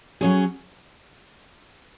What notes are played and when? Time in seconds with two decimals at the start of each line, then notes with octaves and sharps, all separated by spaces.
0.21 F#3 C#4 G#4